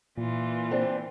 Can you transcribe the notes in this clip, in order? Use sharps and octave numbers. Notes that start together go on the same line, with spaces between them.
A#2 E3 F4
C4 D4